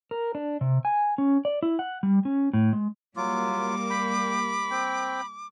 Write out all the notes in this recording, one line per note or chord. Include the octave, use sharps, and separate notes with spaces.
A#4
D4
C3
G#5
C#4
D5
E4
F#5
G3
C#4
A2
G#3
F#3 G3 A#3 F4 D6
G5 B5
C4 G5